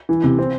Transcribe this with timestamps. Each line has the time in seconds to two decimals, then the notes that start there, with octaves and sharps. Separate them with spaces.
0.09 E3
0.24 C3
0.39 C4